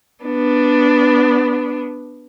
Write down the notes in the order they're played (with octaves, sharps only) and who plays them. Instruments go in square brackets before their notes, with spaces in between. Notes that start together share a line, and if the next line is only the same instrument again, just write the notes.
[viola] B3 D4